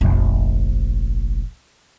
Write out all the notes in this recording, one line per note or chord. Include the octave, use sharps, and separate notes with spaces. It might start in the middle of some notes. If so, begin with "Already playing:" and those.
F1 A#1